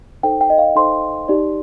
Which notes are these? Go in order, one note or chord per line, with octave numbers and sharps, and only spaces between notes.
D#4 A4 C5 G5
G5
D#5
F5
D#4 A4 C5 C6
D#4 G4 D5